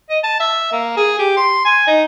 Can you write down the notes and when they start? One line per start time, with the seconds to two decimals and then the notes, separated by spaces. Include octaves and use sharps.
0.10 D#5
0.24 A5
0.40 E5
0.72 A#3
0.97 G#4
1.19 G4
1.37 C6
1.65 G#5
1.87 D#4